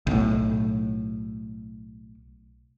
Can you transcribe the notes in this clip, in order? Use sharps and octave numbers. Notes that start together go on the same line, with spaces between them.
B1 A2